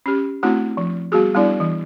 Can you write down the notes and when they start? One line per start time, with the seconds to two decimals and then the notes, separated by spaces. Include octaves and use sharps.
0.06 C#4 G4
0.43 A3 C4 D4 E4 F#4 F#5
0.77 F3
1.12 G3 B3 F#4 G#4
1.35 G3 B3 D4 E4 D5
1.60 E3